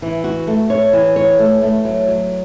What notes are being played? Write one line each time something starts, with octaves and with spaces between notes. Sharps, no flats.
E3
F#4
A3
C#5
E3
C#5
A3
A3
F#3
F#3